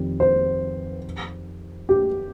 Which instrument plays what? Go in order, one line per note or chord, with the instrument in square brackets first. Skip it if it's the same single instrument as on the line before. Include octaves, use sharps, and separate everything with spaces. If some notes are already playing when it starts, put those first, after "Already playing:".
Already playing: [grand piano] F2 D#3 G3 C4
[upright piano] C5
G4